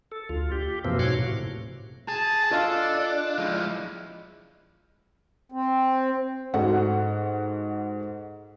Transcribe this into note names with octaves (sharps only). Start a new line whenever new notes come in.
A4
D2 F4
G4
F#2 B2 E3 F3 A#3 C4
G#2 B2 F#4 C#5 C6 D6
A2 C3
G#4 A5
D4 F4 A4 D#5 F5
F3 G#3 E4
C4
G#2 F#4 A4 F#5